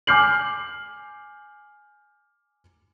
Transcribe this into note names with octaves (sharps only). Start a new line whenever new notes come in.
G#5 D6 F6 G6 C7 F#7